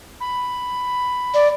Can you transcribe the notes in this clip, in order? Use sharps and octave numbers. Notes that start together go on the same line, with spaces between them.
B5
D5